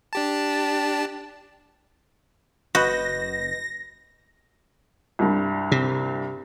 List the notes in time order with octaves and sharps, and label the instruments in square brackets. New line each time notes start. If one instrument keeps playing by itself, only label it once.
[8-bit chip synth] D4 G4 A5
[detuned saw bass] F#1 [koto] F#4 [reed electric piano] B4 D#5 G6 [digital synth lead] A#6
[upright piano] C2 G2
[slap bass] C3